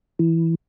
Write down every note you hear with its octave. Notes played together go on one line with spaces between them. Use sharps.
E3